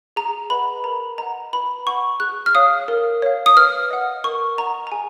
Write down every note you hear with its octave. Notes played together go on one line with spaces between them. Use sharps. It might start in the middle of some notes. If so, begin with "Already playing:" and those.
G#4 A#5
B4 D#5 F#5 B5
A#4 A#5
D#5 F#5 A#5
B4 B5
F#5 C#6
G#4 F#6
F6
C#5 F5 D#6
A#4
C#5 F5
D#6
B4 F6
D#5 F#5
A#4 C#6
D#5 F#5 A#5
A#5
G#4 G#5